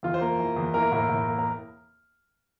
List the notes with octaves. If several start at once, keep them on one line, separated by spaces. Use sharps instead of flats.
E2 F4
C5
A#3 A#4
E3
E2
E3 A#3 A#4
A2 A#3 A#4
A2
A#3
A#4